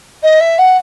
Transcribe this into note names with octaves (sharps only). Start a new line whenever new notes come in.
D#5
E5
F#5